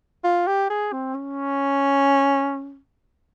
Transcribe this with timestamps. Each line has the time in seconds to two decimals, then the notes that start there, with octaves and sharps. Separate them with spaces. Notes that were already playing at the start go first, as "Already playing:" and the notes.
0.24 F4
0.47 G4
0.70 G#4
0.92 C4
1.14 C#4